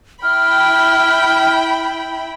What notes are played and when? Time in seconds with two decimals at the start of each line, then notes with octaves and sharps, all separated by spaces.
0.23 E4 G5 B5 F6